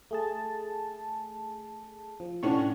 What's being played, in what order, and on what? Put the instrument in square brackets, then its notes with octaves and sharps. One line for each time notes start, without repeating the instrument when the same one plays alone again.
[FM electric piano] A3 G#4 A5
F3
[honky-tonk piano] A2 C#4 D4 [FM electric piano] F#5 C#6